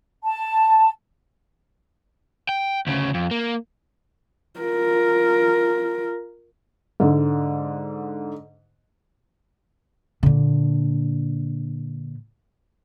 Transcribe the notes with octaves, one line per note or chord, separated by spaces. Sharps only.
A5
G5
D2 C#3
F2
A#3
F4 A#4
G#2 D3
A#2 D3